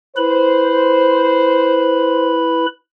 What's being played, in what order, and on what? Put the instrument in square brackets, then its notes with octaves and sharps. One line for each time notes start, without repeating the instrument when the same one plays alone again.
[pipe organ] E4 B4 B5 [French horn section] C5